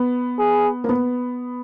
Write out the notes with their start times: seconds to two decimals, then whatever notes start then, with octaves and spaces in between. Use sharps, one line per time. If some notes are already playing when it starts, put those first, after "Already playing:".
Already playing: B3
0.39 G#4
0.84 A#3
0.89 B3